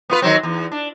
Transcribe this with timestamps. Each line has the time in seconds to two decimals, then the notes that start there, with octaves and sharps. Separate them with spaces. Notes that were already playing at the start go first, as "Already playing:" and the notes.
0.10 B3 F4 B4
0.22 D#3 F#3 C4
0.43 E2
0.72 D4